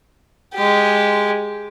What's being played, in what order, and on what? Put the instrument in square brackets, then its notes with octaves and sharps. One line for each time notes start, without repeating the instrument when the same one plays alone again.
[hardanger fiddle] G#3 G4